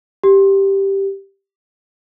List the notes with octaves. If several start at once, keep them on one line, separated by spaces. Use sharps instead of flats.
G4